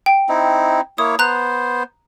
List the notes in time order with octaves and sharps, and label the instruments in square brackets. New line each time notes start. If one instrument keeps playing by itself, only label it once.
[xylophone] G5
[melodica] C4 D#4 E4
[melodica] A#3 E4 C#5 [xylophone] D#6
[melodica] B3 C5 [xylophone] A#5 F#6